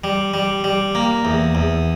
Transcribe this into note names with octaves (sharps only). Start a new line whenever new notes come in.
G3
G3
G3
A#3
E2
E2